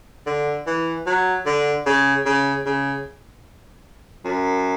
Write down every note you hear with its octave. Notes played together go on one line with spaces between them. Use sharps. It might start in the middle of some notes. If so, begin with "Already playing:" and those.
D3
E3
F#3
D3
C#3
C#3
C#3
F#2